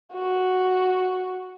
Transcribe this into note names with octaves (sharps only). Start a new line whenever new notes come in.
F#4